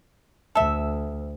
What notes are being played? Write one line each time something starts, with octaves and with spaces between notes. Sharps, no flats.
D2 A4 E5